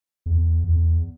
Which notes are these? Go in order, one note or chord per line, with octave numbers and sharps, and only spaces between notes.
E2
E2